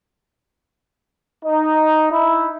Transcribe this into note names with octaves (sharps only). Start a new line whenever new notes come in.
D#4
E4